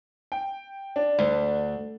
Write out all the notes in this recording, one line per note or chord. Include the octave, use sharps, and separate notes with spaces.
G5
D4
D2